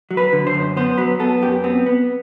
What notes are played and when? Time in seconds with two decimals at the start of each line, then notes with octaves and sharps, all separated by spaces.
0.11 F#3
0.17 B4
0.33 D3
0.47 C5
0.54 F#2
0.77 B3 C5
0.98 F#3 B4
1.20 B3 A4
1.42 F#2 G4
1.64 B3 C4
1.86 B3